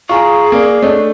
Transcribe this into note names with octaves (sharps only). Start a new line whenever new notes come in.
F4 G#4 G#5 A#5 C#6
A#3 D5 G#5
A3 D4 C#5 D#5